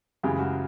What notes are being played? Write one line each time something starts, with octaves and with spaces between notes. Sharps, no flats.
F#2 C#3 E3 G#3 G4
F#4